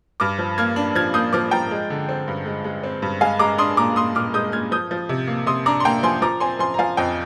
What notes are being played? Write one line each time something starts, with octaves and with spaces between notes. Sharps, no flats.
G2 D6 F6
F3
A#3 F6 G#6
D4
F3 F6 G#6
A#3 D#6 G6
F3 D6 F6
F3 G5 A#5
G#3
D3
C4
G2
G#3
G#3
C4
G2
G#3 F5 G#5
G#3 A#5 D6
D4 C6 D#6
A#2 A#5 D6
A#2 C6 D#6
A#2 D6 F6
G#3 D#6 G6
A#2 F6 G#6
F3 D#6 G6
F3
C3
A#3
C3 C6 D#6
D4 A#5 D6
C6
A#3 G5 A#5
F3 G#5 C6
F3 A#5 D6
C4 G#5 C6
F3 G#5 C6
A#5
F3 F5 G#5
F2 D#5 G5